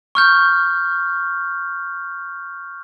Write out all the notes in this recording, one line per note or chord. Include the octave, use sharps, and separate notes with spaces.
C#6 F6 G6